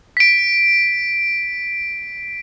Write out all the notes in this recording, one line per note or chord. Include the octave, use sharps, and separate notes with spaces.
B6 D7